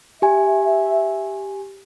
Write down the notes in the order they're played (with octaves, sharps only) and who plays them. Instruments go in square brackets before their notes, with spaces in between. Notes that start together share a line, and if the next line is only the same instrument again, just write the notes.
[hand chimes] G4 G#5 [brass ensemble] E5